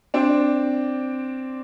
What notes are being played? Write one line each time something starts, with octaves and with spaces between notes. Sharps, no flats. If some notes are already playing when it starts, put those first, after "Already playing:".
C4 D4